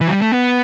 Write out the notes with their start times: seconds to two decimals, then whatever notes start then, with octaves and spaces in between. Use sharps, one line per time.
0.01 E3
0.07 F#3
0.11 G3
0.21 A3
0.32 B3